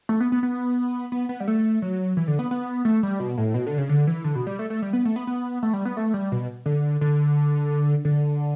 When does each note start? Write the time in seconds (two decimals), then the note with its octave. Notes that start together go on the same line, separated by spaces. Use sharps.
0.09 A3
0.20 B3
0.32 B3
0.43 B3
1.12 B3
1.29 B3
1.40 G3
1.48 A3
1.82 F#3
2.17 E3
2.28 D3
2.39 B3
2.51 B3
2.85 A3
3.03 G3
3.20 B2
3.37 A2
3.54 B2
3.67 D3
3.78 C#3
3.89 D3
4.07 E3
4.24 D3
4.35 B2
4.47 G3
4.59 A3
4.70 A3
4.82 G3
4.93 B3
5.05 A3
5.16 B3
5.27 B3
5.63 A3
5.73 G3
5.85 B3
5.97 A3
6.14 G3
6.32 B2
6.66 D3
7.01 D3
8.05 D3